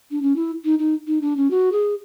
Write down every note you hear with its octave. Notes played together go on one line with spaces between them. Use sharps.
D4
C#4
E4
D#4
D#4
D#4
D4
C#4
F#4
G#4